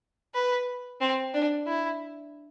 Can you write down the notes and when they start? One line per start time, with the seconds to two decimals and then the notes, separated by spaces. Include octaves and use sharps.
0.34 B4
1.01 C4
1.34 D4
1.67 E4